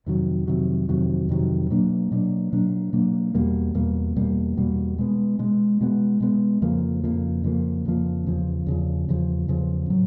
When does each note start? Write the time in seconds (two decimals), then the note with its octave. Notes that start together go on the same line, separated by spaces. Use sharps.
0.06 F2 C3 D#3 F#3
0.48 F2 C3 D#3 F#3
0.89 F2 C3 D#3 F#3
1.29 F2 C3 D#3 F#3
1.70 B2 F#3 A#3 D4
2.11 B2 F#3 A#3 D4
2.53 B2 F#3 A#3 D4
2.93 B2 F#3 A#3 D4
3.34 E2 B2 G3 A#3
3.75 E2 B2 G3 A#3
4.16 E2 B2 G3 A#3
4.57 E2 B2 G3 A#3
4.98 B2 G#3 B3
5.39 B2 G#3 B3
5.81 B2 G#3 B3
6.20 B2 G#3 B3
6.62 F2 C#3 F3 A#3
7.03 F2 C#3 F3 A#3
7.44 F2 C#3 F3 A#3
7.85 F2 C#3 F3 A#3
8.26 E2 C#3 F3
8.67 E2 C#3 F3
9.08 E2 C#3 F3
9.48 E2 C#3 F3
9.90 A2 F#3